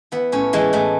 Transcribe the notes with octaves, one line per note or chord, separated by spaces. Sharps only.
E3 B3
A2 C#4
E3 G#3
A2 A3